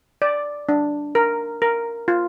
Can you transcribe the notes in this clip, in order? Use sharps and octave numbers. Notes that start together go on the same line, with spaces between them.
D5
D4
A#4
A#4
F4